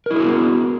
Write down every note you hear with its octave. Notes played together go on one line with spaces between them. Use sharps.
B3 E4 F#4 G#4 A#4